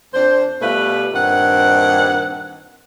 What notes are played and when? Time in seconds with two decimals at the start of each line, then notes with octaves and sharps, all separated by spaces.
0.14 F2 D4 C5
0.62 B2 G3 A3 F4 B4
1.13 G2 A#2 D#3 C4 F#5